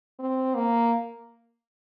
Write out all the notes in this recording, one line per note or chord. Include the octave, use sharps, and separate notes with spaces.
C4
A#3